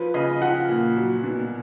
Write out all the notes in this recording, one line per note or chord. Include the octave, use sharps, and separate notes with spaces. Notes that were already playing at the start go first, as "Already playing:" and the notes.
Already playing: F3 B4
C#3 D#5
F3 F#5
A#2
F#3
B2